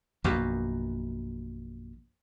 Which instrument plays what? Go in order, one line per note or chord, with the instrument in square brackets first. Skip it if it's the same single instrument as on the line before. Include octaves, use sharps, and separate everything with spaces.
[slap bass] A#1 F#2 B2